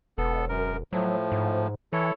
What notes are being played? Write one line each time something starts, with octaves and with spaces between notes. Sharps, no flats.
E1 B3 A4
F#2 A#4
A2 F3 F#3
G#2
E3 E4 A4 C#5